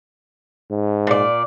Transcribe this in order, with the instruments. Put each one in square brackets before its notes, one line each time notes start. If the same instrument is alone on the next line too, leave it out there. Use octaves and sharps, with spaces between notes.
[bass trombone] G#2
[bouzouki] A#2 D5